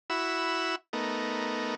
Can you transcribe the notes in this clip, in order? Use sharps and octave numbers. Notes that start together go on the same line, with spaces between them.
E4 F#4 B5 E6
A3 B3 D#4 A#4